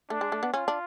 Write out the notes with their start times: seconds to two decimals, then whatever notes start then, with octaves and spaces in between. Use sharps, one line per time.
0.10 A3 D4
0.21 G#3
0.32 A3
0.43 B3
0.54 C#4 F4
0.68 D4